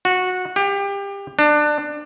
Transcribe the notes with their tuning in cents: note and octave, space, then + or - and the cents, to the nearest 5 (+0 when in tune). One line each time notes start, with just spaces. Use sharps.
F#4 -15
G4 +25
D4 +20